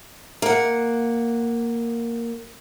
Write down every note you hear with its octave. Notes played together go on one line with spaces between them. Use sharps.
A#3 F#5